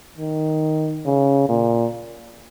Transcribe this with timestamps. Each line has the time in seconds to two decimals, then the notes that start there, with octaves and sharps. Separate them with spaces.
0.18 D#3
1.06 C#3
1.49 A#2